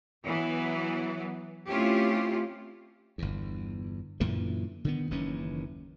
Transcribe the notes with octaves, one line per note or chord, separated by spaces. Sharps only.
E3 F#3 B3
A3 C4 C#4 E4 F4 G4
G1 E2
F#2 A#2 D3 E3
D3 D#3 B3
F#1 D#2 E3 C#4